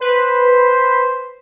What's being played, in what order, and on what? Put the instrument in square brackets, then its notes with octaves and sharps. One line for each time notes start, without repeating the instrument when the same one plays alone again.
[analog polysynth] B4 B6 [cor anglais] C5